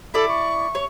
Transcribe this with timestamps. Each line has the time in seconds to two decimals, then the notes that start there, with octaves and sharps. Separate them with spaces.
0.14 E4 A4 D5
0.28 C#6
0.75 C#5